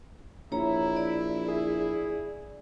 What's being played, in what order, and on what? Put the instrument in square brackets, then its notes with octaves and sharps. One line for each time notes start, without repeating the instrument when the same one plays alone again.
[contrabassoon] A#1 [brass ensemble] E4 [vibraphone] C#5 A#5
[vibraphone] D5
[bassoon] G#4